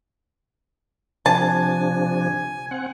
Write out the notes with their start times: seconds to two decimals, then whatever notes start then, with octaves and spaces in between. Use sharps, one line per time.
1.26 C3 F3 D4 G#5 A5
2.71 C4 F#5